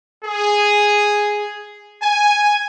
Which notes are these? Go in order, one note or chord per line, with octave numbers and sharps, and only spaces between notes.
G#4
G#5